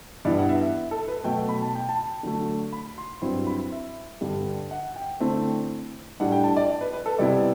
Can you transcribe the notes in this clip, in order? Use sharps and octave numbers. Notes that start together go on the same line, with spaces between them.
G2 E3 B3 E4 D5
F#5
E5
E5
A4
B4
B2 F#3 A3 G5
B5
A5
G5
A5
D3 F#3 A3
B5
C6
G2 F#3 C4 E4 C6
B5
E5
G2 D3 G3
F#5
G5
D3 A3 C4 E4
A2 G3 D4 F#5
G5
A5
D5
B4
B4
A4
C3 G3 B3 E4 D5